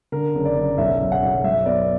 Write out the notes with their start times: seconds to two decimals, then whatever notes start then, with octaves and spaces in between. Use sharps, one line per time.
0.12 D3 A#4
0.35 F#1
0.45 D5
0.57 F#1
0.78 B1 E5
1.00 B1
1.12 F#5
1.23 B1
1.44 F#2 E5
1.65 B3 D5